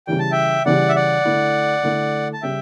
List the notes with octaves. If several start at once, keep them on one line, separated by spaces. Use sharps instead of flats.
C#3 E3 G3 G5
A5
E5 G5
C#3 E3 G3 D5 F#5
E5
D5 F#5
D3 A3 E4
D3 A3 E4
A5
C#3 G3 E5 G5